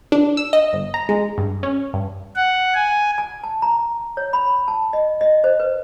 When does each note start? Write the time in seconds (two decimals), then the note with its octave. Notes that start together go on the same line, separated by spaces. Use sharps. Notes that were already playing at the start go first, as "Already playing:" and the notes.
0.12 D4
0.37 E6
0.53 D#5
0.73 G1
0.94 A#5
1.09 G#3
1.38 G2
1.63 C#4
1.93 G2
2.36 F#5
2.74 G#5
3.18 G#5
3.44 A5
3.62 A#5
4.17 C#5
4.33 B5
4.68 A5
4.93 D#5
5.21 D#5
5.44 C5
5.59 B4